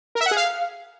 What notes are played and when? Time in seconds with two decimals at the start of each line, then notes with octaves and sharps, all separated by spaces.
0.15 A#4
0.21 E5
0.26 F#5
0.31 G#4
0.37 F5